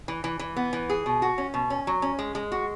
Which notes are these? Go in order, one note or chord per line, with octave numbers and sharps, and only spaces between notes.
E3
E3
E3
B3
E3
G#4
B2
F#4
C#4
B2
C#4
F#3
C#4
G#3
G#3
F#4